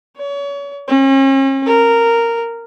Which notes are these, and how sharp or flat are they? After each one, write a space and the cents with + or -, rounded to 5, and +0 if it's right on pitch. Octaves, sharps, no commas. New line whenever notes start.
C#5 +35
C#4 -40
A#4 -10